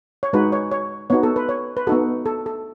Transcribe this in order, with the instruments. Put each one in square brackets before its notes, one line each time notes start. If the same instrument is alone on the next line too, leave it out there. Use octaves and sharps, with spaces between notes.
[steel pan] C#5
G#3 D#4 F#4 B4
C#5
C#5
B3 D#4 F#4 C#5
A4
B4
C#5
B4
B3 D#4 F#4 A4
A4
A4